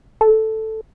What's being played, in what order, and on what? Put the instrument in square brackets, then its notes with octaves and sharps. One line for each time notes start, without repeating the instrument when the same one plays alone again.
[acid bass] A4